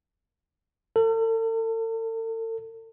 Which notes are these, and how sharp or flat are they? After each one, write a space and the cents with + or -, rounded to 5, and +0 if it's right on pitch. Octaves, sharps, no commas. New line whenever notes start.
A4 +40